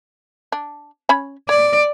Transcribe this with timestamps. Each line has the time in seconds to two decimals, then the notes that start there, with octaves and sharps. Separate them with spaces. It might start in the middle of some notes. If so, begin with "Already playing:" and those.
0.52 D4
1.09 C#4 C#5 B5
1.49 C#5 D5